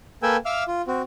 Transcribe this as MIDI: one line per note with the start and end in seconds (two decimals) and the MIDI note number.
0.23 0.37 58
0.23 0.37 69
0.23 0.37 71
0.23 0.37 79
0.23 0.37 80
0.23 0.37 88
0.45 0.63 76
0.45 0.63 77
0.45 0.63 86
0.45 0.63 88
0.45 0.63 89
0.68 0.82 65
0.88 1.02 60
0.88 1.02 66